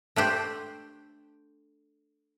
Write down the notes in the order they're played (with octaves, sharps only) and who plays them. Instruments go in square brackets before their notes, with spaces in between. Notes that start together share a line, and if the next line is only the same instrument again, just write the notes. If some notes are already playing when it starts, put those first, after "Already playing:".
[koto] A3 D4 G4 C5